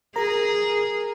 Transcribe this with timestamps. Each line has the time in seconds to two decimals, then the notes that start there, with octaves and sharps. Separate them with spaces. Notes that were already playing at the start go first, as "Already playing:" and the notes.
0.16 G#4 A#4 A#5